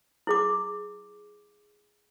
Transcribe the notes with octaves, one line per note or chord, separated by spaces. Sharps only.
E4 G#4 D6